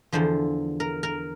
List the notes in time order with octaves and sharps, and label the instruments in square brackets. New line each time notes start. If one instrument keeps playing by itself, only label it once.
[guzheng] E2 D3 F3 C5
A#4
A#4